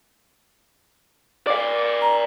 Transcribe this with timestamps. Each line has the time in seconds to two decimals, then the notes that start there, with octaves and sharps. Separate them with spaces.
1.47 D5 F5 D6
2.02 A#5